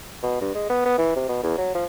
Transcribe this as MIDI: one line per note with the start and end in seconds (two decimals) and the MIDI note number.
0.23 0.38 47
0.41 0.51 43
0.55 0.67 56
0.70 0.81 59
0.85 0.95 59
0.98 1.13 52
1.16 1.26 48
1.29 1.41 47
1.43 1.52 40
1.58 1.70 54
1.74 1.85 53